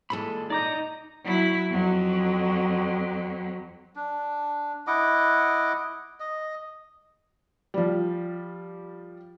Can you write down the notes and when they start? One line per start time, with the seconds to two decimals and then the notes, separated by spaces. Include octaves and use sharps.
0.10 A#2 E3 G#3 A4 B5
0.50 D#4 D5 A#5 D6 G6
1.25 F#3 E4
1.71 F2 F#3
3.96 D4
4.87 E4 D#5 F#5 D6
6.20 D#5
7.74 F3 G3